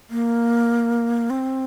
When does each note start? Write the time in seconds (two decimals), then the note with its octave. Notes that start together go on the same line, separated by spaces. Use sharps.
0.10 A#3
1.30 C4